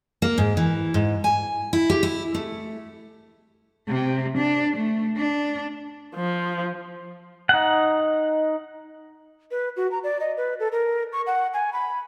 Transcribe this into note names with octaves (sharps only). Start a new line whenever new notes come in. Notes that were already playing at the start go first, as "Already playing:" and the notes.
A#3
G#2
E3
G#2
G#5
E4
G4
E4
A3
C3
D4
A3
D4
F3
D#4 F#5
B4
F#4
A#5
D5
D#5
B4
A4
A#4
C#6
F#5
G#5
B5